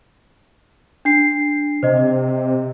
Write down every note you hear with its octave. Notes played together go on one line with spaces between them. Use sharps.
D4 C7
C3 C5 D#5